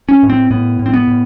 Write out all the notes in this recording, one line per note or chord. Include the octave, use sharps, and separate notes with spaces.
C#4
A2
C4
A2 B3
A2
C4
B3
A2